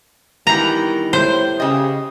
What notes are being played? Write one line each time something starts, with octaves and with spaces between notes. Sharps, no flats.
D#3 E3 G3 B3 A#5
A2 C5
C#3 G4 D#5